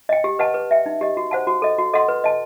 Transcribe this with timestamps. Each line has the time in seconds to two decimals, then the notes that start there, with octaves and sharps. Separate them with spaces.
0.09 D#5 G5
0.24 G4
0.39 B4 D#5 F#5 A5
0.54 B4
0.71 E5 G5
0.86 D#4
1.01 G4 D#5
1.17 F#4
1.31 C5 F#5 A5
1.47 F#4
1.62 A4 D#5
1.78 F#4
1.94 A4 D#5 F#5 C6
2.08 B4
2.24 D#5 A5